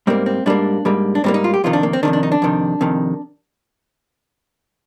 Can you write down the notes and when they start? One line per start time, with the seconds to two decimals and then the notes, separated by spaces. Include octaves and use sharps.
0.07 G#2 G3 A#3 C4
0.26 C4
0.46 G#2 G3 A#3 D4
0.85 G#2 G3 A#3
1.15 D4
1.24 G#2 G3 A#3 C4
1.34 D#4
1.44 F4
1.54 G4
1.64 F2 C3 D#3 F4
1.73 D4
1.83 A#3
1.93 C4
2.03 F2 C3 D#3 D4
2.13 D4
2.23 D#4
2.32 D4
2.42 F2 C3 D#3
2.81 F2 C3 D#3